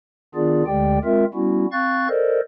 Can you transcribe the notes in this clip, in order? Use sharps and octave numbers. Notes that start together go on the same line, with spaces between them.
D#3 B3 D4 F4 G#4 D5
D2 D3 G#3 G4 D5 G5
G#3 C4 F4 A#4 E5
G3 B3 C#4 E4 F#4
C4 F5 C#6 F#6 A6
A4 A#4 C5 D5 D#5